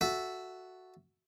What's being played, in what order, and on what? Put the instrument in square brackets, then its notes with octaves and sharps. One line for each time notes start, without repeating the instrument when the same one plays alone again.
[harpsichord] F#4 A4 E5